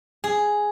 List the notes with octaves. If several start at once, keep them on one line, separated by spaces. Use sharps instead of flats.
G#4